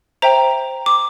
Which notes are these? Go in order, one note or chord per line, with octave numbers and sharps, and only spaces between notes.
C5 E5 G5 A#5
D6